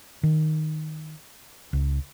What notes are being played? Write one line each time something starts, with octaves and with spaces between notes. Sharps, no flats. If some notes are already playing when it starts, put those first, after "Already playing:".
D#3
C#2